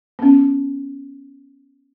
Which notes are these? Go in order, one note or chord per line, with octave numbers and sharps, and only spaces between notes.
B3 C#4